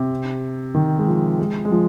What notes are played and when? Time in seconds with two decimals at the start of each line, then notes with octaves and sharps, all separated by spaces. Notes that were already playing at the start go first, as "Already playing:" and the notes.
Already playing: C3
0.74 D#3
0.98 G#3
1.07 F3
1.39 G#3
1.65 G#3
1.71 F3